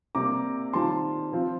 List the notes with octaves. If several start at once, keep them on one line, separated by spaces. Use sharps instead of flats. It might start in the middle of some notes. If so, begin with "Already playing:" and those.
C3 G3 A#3 A#5 D6
D#3 G3 C4 F4 A5 C6
F3 C4 F4